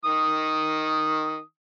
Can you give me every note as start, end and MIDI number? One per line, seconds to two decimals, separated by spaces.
0.05 1.41 51
0.05 1.41 87